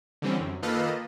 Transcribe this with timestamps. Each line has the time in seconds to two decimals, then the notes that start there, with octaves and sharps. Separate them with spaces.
0.22 D3 E3 G3 C4 C#4
0.40 F#2
0.62 D#3 A#3 F4 A4 B4 D#5